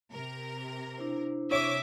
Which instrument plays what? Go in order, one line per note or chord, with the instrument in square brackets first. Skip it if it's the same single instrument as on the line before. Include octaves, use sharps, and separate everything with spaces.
[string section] C3 A#4
[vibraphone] D4 E4 C5
[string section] C3 D6 D#6 [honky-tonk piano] C#5 [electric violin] E5